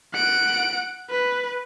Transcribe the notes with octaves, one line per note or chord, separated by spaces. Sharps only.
F#5 D7
B4